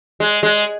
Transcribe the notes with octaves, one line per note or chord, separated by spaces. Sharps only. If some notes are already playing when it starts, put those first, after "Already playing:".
G#3
G#3